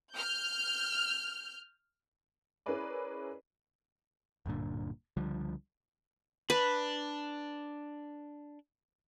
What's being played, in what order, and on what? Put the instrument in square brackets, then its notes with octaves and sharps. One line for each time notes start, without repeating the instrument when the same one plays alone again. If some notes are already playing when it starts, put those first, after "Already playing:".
[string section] F6 G6
[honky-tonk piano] C#4 E4 G#4 A#4 B4 D5
[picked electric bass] D1 G2 A#2 D3
C#2 D3 F3 G3
[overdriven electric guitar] D4 [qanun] B4